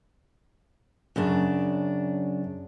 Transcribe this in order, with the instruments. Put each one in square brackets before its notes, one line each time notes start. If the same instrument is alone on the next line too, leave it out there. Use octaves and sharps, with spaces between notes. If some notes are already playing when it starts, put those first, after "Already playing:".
[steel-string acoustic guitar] F#2 C#3 D4